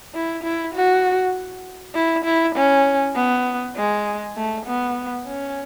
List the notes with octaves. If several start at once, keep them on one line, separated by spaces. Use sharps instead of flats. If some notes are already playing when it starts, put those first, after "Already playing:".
E4
E4
F#4
E4
E4
C#4
B3
G#3
A3
B3
C#4